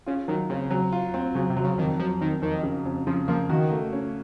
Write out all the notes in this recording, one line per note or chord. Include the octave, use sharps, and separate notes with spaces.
C#3 F4
D#3 F#3
C#3 C4
F#3
F4
C4
C#3 F#3
C3
F#3
C#3
F2 D#3
F3 F#3
F2 D#3
F2 D#3
C#3
F2
C#3 F3
F3 A#3
D#3 F#4
A3
C#4